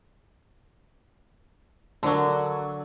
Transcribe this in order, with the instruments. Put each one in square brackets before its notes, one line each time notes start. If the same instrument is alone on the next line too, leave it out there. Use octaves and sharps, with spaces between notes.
[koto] D3 F#3 [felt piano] A#4 D5 A5